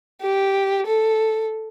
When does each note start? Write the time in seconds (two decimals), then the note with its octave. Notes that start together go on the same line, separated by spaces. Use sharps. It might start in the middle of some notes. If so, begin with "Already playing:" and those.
0.22 G4
0.86 A4